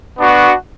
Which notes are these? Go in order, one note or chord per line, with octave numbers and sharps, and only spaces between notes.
B3 D4 F#4